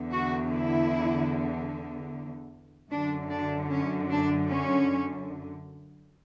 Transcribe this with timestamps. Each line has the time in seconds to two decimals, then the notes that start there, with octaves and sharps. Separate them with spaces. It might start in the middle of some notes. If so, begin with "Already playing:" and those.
Already playing: E2 D3
0.13 F#4
0.53 E4
2.91 F#2 D3 D4
3.31 D4
3.70 C#4
4.10 D4
4.50 C#4